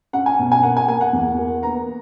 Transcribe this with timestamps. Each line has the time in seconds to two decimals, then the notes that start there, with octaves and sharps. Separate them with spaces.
0.13 C#4 F#5
0.26 G#5
0.39 B2
0.52 G#5
0.63 A#3 F#5
0.77 G#5
0.88 A#3 G#5
1.01 F#5
1.13 E2
1.39 A#3
1.63 B3 A#5